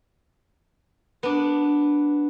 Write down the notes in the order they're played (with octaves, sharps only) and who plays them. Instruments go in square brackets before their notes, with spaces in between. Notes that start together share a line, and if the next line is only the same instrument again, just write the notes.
[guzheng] B3 D4